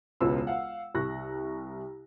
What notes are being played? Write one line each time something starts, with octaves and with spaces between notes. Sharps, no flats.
E1 C#2 B3 F4 E6
F5 F#5
C2 C#6 F#6 A#6